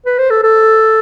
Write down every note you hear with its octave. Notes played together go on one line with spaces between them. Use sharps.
B4
C5
A4
A4